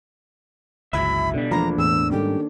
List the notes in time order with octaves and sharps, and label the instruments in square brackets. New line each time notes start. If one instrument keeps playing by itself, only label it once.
[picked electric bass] G1 C#2 [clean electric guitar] F#3 E4 E5 [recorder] B5
[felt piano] B2 D4 [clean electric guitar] D3 G3
[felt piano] E1 A3 B5 [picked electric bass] F3 [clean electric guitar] A#3 D4 [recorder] A#5
[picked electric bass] E2 A2 [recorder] E6
[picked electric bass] G#2 G3 [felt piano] D#3 C#4 A4 [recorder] G4